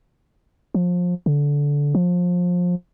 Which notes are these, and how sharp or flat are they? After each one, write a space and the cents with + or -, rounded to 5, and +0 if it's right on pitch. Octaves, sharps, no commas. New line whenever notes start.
F3 +25
D3 -20
F3 +25